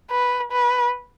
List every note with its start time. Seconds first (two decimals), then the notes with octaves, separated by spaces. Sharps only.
0.11 B4
0.52 B4